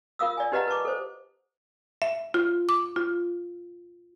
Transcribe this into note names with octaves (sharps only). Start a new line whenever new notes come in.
F4 A#4 F5 D#6 E6
D5 G#5
D#4 G4 B4 D#5 F#5 A#5
B4 A5 C#6 D6
A4 C5
E5
F4
D6
F4